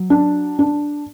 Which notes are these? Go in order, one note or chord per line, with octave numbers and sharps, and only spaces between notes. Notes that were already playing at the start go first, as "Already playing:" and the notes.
Already playing: F#3
D4
D4